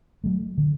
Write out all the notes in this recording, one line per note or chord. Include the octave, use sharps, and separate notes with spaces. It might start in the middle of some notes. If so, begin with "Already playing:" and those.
F#3 A3
D3